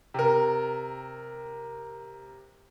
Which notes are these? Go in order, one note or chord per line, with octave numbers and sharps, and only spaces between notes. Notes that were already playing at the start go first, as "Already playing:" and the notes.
C3 A#4